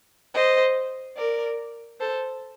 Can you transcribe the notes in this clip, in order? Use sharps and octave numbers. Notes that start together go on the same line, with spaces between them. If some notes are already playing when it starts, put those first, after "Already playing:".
C5 D#5
A#4 D5
A4 C5